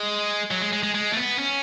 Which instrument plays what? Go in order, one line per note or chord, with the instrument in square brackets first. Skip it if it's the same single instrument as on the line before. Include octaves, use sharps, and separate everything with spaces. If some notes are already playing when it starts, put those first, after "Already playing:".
Already playing: [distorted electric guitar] G#3
F#3
G#3
G#3
G#3
G#3
A3
B3
C#4